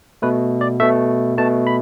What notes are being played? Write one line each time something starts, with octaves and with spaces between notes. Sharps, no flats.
B2 A3 B4
D5
B2 A3 E5
B2 A3 A5
B5